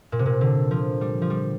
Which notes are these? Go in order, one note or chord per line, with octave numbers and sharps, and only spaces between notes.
A#2
C3
A#2
D3
F3
G3
F3
G3